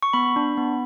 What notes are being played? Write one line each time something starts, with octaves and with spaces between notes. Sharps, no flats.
C#6
B3 B5
D4
B3